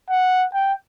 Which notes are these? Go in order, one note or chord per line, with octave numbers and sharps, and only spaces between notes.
F#5
G5